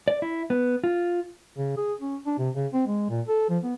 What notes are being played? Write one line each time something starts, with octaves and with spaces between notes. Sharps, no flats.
D5
E4
B3
F4
C#3
G#4
C#4
D4
C3
C#3
C4
G#3
A#2
A4
F3
B3